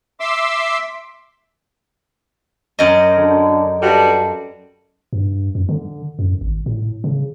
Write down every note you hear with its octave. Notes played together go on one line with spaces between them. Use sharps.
E5 C6 D6 E6
F#2 D#5
D3
G2 G3 F#4 A4
G2
F#2
D3
F#2
G#1
A2
C#3